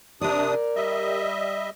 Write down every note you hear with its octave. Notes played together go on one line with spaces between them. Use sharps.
C3 D4 A#4 D5 D#6
G3 D#5 E5